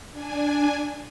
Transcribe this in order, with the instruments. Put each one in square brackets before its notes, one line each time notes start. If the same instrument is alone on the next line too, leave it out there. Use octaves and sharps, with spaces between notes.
[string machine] D4 G#5